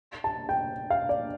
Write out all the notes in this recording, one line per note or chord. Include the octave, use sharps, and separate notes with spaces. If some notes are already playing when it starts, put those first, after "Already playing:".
A5
G5
F5
D5